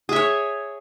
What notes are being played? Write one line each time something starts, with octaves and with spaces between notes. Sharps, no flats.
G#4 C#5 E5